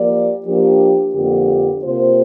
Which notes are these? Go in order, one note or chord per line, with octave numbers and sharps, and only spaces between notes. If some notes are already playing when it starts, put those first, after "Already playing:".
Already playing: F3 A#3 G4 D5
F3 A#3 D4 G4
F2 D3 F3 A#3 G4
C3 A#3 F4 C5